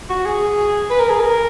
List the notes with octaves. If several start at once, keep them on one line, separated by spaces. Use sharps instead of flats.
F#4
G#4
B4
A#4
G#4
A#4